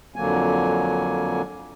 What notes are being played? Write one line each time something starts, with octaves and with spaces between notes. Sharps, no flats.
F2 D3 F#3 A#3 G#5